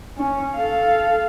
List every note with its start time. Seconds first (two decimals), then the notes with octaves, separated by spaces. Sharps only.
0.18 C#4
0.55 A4 F5